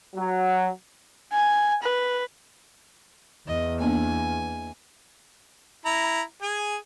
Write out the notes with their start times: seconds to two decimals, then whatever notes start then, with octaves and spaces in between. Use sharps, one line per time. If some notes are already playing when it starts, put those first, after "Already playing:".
0.15 F#3
1.32 G#5
1.83 B4
3.47 E2 D#5
3.80 A#3 B3 D4 G#5
5.85 E4 A#5 B5
6.42 G#4 G#5